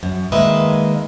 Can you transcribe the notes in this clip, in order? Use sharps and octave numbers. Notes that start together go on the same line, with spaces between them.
F#2
D#3 G#3 A#3 B4 D#5 E5